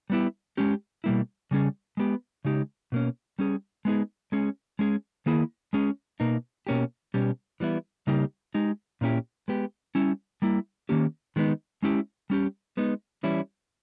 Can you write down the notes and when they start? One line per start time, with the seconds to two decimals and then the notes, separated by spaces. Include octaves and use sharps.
0.10 G3 B3 E4 G4
0.57 G#3 C#4 G4
1.04 B2 G3 A#3 E4
1.51 C#3 G3 C#4 G#4
1.97 G#3 B3 G4
2.45 C#3 G#3 D#4 G4
2.92 B2 A#3 C#4
3.39 G3 C#4 G#4
3.85 G#3 B3 D#4 G#4
4.32 G#3 C#4 G#4
4.79 G#3 C#4 G#4
5.26 D#3 A#3 E4 G#4
5.73 G#3 C#4 G#4
6.20 B2 A#3 D#4
6.67 B2 A#3 C#4 G4
7.14 B2 G3 C#4 G4
7.60 E3 G3 B3 E4
8.07 C#3 G3 A#3 D#4 G4
8.54 G#3 D#4 G4
9.01 A#2 A#3 C#4 E4 G4
9.48 G#3 B3 G4
9.95 G3 C#4 E4
10.42 G3 A#3 E4
10.89 D#3 A#3 C#4 G4
11.36 D#3 G#3 B3 D#4
11.83 G#3 C#4 E4 G4
12.30 G3 C#4 G4
12.77 G#3 B3 D#4
13.23 E3 G3 C#4 E4